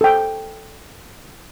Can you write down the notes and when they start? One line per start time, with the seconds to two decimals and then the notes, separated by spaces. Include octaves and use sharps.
0.01 A4 G5